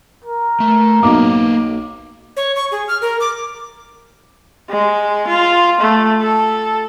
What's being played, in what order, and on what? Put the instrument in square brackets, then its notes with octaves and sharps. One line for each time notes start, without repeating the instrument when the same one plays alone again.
[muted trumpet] A#4
[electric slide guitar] A3
[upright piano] B1 D6 [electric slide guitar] A#3 B4 F5
[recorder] C#5
C#6
G#4
F6
A#4
D6
[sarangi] G#3
F4
A3
A4